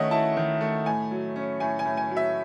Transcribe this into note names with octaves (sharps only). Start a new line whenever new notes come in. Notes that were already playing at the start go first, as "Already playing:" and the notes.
Already playing: D#3 A3 C#4 D#5 E5 F#5
E4 A5
D#3
A3
A2 G#5
F#3
C#4
A2 G#5
G#5
A2
G#5
F#3
E5